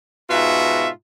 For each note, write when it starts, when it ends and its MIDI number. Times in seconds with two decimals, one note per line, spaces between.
0.28 0.87 44
0.28 0.87 47
0.28 0.87 65
0.28 0.87 66
0.28 0.87 76